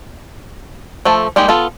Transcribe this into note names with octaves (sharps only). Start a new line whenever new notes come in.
F3 A3 A4
G3 G#3 A#3 D#4 G4
B3 F4 A4